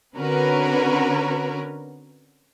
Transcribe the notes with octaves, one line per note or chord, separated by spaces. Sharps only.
D3 C4 C#4 F#4 A#4 B4